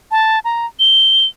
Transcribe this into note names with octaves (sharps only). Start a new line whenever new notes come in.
A5
A#5
G7